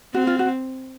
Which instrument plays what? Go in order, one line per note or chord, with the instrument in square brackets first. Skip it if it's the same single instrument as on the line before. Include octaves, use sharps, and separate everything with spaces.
[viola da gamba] C4 [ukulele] F#4
[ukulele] F4
F#4